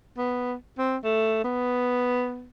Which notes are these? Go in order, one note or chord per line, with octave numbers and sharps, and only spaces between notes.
B3
C4
A3
B3